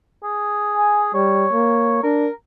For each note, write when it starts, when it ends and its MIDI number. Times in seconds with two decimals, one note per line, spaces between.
0.23 1.10 68
0.76 1.03 80
1.14 1.47 55
1.14 2.03 73
1.53 2.02 58
2.03 2.28 62
2.03 2.30 70